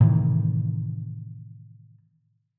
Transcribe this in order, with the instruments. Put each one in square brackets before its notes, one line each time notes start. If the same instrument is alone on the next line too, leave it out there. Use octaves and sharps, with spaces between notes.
[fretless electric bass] A2 C3 D#3 E3